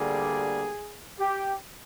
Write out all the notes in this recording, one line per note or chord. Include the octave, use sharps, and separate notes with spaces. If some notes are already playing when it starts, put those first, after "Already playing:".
Already playing: D2 D3 G3 A#3 G#4
G4